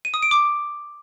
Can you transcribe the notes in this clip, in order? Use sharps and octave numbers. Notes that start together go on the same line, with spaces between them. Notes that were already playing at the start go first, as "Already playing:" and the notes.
D#7
D#6
D7
D6